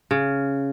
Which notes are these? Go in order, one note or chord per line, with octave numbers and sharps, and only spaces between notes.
C#3